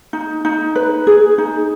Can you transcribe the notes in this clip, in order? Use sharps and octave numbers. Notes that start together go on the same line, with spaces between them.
D#4
D#4
B4
G#4
D#4